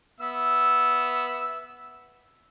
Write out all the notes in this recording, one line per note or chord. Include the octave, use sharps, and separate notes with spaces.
B3 E5 E6